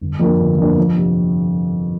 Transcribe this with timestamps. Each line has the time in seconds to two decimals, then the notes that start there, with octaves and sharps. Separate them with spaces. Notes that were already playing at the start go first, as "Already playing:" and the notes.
0.01 G1
0.20 F2 F3 A#3 D4
0.39 G1
0.58 F2 F3 A#3 D4
0.78 F2
0.97 C3